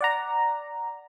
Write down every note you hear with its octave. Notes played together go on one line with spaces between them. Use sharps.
D5 F#5 A#5